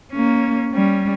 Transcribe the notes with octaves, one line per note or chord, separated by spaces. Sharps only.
A#3 C#4
G3 C#4